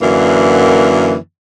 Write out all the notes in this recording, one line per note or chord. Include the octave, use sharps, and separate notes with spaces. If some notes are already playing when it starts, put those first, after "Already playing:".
F#2 D3 E3 A#3